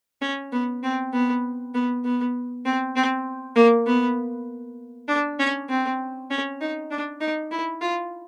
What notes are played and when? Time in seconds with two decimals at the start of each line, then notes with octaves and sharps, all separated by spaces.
0.21 C#4
0.52 B3
0.83 C4
1.13 B3
1.74 B3
2.04 B3
2.65 C4
2.96 C4
3.56 A#3
3.86 B3
5.08 D4
5.39 C#4
5.69 C4
6.30 C#4
6.61 D#4
6.91 D4
7.21 D#4
7.51 E4
7.81 F4